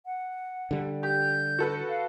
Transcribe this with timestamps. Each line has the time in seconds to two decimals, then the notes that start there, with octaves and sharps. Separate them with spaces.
0.06 F#5
0.71 D3 G3
1.03 G4 G6
1.59 F#4 A4 B4
1.89 F5